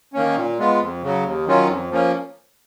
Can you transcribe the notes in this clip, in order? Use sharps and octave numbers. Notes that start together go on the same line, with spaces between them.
D#3 A#3 C#4
A#2
G#3 B3 F4
F2
C#3 F#3
D#2
D#3 F#3 C#4 F4
F2
F3 A#3 C#4